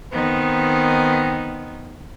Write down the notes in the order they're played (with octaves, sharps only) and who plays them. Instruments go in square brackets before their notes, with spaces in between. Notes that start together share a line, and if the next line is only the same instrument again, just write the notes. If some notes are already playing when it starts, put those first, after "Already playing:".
[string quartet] D#3 B3 C4 D#4